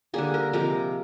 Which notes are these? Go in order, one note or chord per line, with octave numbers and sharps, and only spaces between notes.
D3 G3 A#3 G#4
A#4
C3 F3 G#3 A#4